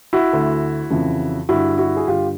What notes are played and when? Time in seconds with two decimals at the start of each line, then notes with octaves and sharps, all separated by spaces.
0.13 E4 F#4
0.33 D2 D3
0.90 F2 C#3 E3
1.49 G2 D3 E4 F#4
1.78 E4 F#4
1.97 G#4
2.07 G2 D3 F4 G4